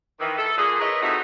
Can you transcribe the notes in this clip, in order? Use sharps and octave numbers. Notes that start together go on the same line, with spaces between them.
D#3 E3
A4
A#2 G#4
E4 A#4 B4 C#5 D#5 E5
F2 A3 C4 D#4 F#4 E5